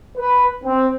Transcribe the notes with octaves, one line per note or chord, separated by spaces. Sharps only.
B4
C4